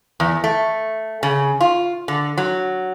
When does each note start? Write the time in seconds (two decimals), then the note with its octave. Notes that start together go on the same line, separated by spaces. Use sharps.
0.20 E2
0.44 A3
1.23 C#3
1.61 F4
2.08 D3
2.38 F#3